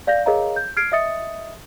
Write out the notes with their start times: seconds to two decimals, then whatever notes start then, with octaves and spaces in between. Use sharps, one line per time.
0.07 D5 F5 G6 A#6
0.26 G#4 A#4 C#5 D#5 F5 A#5
0.56 G6
0.77 F6 G#6 C7 D7
0.92 D#5 E5 D#6 A6 C#7